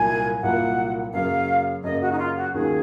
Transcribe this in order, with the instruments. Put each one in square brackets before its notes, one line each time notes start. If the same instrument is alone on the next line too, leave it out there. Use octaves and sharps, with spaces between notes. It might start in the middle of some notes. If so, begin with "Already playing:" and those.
Already playing: [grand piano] C2 A#2 F#3 A#3 F4 [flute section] G#5
[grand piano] C2 A#2 F#3 A#3 F4 [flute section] F#5
[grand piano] F#2 C#3 F#3 A#3 C#4 [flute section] F5
[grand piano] F#2 C#3 F#3 A#3 C#4 [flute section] D#5
[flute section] F#4
D#4
F4
F#4
[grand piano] D#2 D#3 F#3 C#4 F4 [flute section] G#4